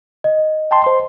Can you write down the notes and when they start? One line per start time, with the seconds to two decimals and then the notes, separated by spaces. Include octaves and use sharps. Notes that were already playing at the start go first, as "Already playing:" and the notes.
0.24 D#5
0.71 G5 A5 C6
0.84 C5 C6